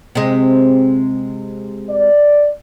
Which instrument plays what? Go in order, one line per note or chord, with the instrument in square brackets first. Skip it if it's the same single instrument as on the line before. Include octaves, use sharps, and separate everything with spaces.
[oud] C3 G#3
[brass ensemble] D5